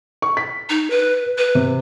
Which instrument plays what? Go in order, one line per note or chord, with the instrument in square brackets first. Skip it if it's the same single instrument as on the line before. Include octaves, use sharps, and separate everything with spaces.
[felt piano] C#6
B6
[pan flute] D#4
B4
B4
[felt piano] C3